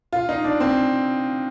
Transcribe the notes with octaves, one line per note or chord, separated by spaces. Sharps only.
F4
D#4
D4
C4